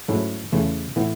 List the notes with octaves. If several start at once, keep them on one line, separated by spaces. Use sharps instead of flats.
G#2 F#3 A3 C#4 E4
E2 C#3 E3 A3
A2 E3 B3